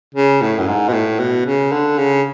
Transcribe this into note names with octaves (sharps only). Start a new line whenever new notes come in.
C#3
A2
F#2
G#2
B2
A2
B2
C#3
D3
C#3